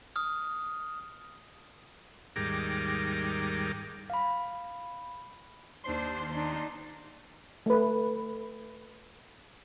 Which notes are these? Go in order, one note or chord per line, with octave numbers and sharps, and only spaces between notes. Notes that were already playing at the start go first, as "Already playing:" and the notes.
D#6 F6
D#2 G#2 G3 A#4 D6
F5 B5
D#2 D4 C5 C6
D4 D#4
A3 B4